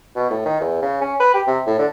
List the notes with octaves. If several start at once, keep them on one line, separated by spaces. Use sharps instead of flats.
B2
A2
D#3
E2
C#3
C#4
B4
G4
C3
A2
D3